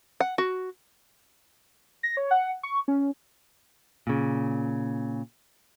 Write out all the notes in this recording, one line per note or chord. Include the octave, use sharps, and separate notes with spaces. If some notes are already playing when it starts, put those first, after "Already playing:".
F#5
F#4
A#6
C#5
F#5
C#6
C#4
A#2 C#3